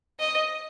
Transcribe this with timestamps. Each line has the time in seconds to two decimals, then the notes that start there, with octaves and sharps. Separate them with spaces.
0.20 D#5